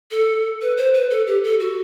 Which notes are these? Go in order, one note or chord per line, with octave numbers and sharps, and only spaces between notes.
A4
B4
C5
B4
A4
G4
A4
F#4